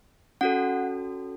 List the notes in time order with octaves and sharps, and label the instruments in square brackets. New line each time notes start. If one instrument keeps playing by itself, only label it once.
[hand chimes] C#4 F#4 A4 F#5